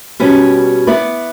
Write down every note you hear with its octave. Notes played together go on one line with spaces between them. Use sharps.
B2 G3 C#4 G4 B4
B3 E4 B4 D5